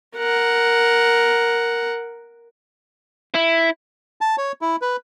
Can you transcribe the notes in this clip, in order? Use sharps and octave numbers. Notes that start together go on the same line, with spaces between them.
A#4 F#5
E4
A5
C#5
E4
B4